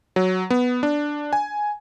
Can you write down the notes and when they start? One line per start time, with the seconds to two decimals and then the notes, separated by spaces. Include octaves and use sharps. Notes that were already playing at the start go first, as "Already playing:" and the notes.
0.16 F#3
0.50 B3
0.83 D4
1.33 G#5